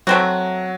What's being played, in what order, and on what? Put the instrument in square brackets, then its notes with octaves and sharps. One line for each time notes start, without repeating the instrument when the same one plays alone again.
[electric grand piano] F#3 [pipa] A3 C4 F#4